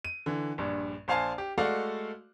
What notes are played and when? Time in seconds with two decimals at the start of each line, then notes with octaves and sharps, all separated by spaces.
0.05 D#7
0.26 D3 E3
0.58 A#1 G2
1.08 A#1 C5 F5 G#5 A5 C7
1.38 G4
1.58 G#3 A3 F#4 A4 D5 F5